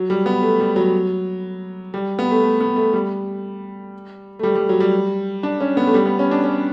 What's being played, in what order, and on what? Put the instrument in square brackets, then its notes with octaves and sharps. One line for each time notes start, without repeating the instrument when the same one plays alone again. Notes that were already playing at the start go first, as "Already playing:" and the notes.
Already playing: [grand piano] F#3
G3
B3
A3
G3
F#3
G3
B3
A3
A3
B3
A3
G3
A3
G3
G3
F#3
G3
D4
C#4
B3
A3
G3
B3
C#4
D4
C#4